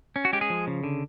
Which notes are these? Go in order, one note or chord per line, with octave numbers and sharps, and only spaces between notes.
C#4
F#4
G#3 G4
G#4
F3
C#3
D3